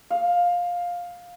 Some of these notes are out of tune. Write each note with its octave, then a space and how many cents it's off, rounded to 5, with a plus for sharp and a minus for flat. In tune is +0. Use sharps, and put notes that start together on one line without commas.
F5 +10